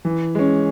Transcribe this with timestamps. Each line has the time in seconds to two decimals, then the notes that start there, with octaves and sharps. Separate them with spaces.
0.05 E3
0.35 G#3 C#4